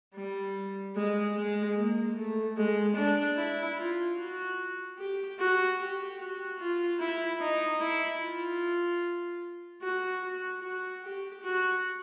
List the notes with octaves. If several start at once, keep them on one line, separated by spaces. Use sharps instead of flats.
G3
G#3
G#3
A#3
A3
G#3
D4
E4
F4
F#4
G4
F#4
G4
F#4
F4
E4
D#4
E4
F4
F#4
F#4
F#4
G4
F#4